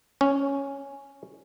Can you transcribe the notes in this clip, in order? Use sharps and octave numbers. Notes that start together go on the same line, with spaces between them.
C#4